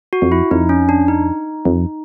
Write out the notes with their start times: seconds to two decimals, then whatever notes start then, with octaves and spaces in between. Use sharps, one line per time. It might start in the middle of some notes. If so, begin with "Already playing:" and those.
0.13 F#4
0.22 F2
0.32 E4
0.51 F2 D#4
0.69 C#4
0.89 D4
1.08 D#4
1.65 F2